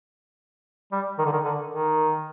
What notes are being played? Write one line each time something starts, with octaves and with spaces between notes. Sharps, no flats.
G3
D#3
D3
D#3
D3
D#3